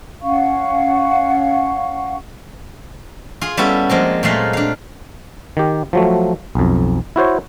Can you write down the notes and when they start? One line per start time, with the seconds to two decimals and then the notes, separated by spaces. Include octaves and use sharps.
0.23 C#4 F5 F#5 C#6
3.41 F4 G#4
3.57 G3 B3 C#4 E4 F#4 A4
3.90 F3 G#3 A#3 C4
4.23 A#2 F#3 G#3 A3 F5 C6
4.53 D4 F5
5.57 D#3 G4
5.93 F3 F#3 A3
6.55 B1 F2
7.16 E4 F#4 C5 C#5